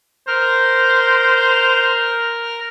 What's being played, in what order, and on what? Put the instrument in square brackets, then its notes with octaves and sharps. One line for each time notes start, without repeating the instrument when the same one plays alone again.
[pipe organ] A#4 F6 [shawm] C5